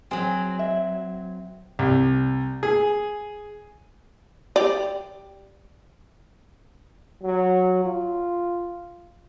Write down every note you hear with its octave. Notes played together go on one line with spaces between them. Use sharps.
F#3 C4 G#4 G#5
E5
C2
G#4
G4 D5
F#3
F4